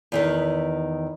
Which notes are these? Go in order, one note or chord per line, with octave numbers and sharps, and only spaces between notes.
E2 D#3 B4